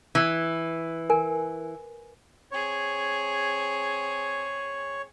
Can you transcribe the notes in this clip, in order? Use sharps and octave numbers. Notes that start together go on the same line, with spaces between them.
E3
A#4 G#5
C4 G#4 C#5